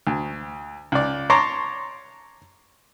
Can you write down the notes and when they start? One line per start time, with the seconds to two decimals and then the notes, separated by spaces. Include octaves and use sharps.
0.07 D2
0.92 C#2 D5
1.30 C#5 A5 A#5 C6 D6